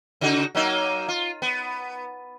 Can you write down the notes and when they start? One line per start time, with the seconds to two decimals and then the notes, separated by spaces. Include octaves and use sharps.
0.21 C#3 D#4 F#4
0.55 F#3 A#3 D#4
1.08 F4
1.42 B3